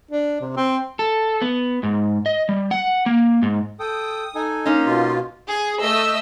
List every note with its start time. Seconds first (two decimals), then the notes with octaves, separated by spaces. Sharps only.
0.11 D4
0.41 C3
0.56 C4
0.99 A4
1.41 B3
1.83 G#2
2.26 D#5
2.49 G3
2.71 F#5
3.06 A#3
3.42 G#2
3.80 A4 G5 D#6
4.35 D#4 A4 G#5
4.66 A#3 C#4 D#4 D#5 C6
4.85 B2 F4
5.48 G#4
5.82 A3 D#5 E5 E6